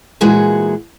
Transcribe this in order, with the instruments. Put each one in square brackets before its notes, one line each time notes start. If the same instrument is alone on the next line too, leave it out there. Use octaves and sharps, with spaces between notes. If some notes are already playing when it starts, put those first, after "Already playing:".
[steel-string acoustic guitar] A#2 E3 G#3 F#4 G#4 F#5